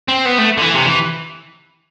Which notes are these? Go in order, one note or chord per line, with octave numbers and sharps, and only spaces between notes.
C4
B3
A3
D3
E3
C3
E3